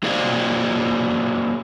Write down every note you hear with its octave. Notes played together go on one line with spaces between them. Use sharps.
F#3 A#3 G#4 C5 D5 F5